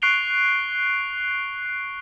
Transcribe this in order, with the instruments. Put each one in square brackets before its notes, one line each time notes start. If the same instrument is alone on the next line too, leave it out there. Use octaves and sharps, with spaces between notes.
[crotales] C#6 F#6 C7 D7 F7 G7